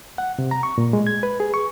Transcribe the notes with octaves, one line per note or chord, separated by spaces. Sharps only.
F#5
C3
A#5
C#6
A#2
G#3
G#6
B4
G#4
C#6